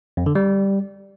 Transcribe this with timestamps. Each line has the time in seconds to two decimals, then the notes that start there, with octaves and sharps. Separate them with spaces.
0.17 F2
0.26 D3
0.35 G3